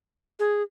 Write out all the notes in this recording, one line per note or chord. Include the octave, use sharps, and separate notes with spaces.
G#4